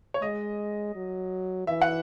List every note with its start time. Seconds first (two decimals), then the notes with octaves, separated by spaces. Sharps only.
0.14 C#5
0.22 G#3 D#5
0.95 F#3
1.67 E3 E5
1.81 F#5